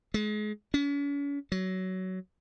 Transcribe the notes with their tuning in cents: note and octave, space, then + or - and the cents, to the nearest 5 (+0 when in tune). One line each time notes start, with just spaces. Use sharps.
G#3 +30
C#4 +40
F#3 +15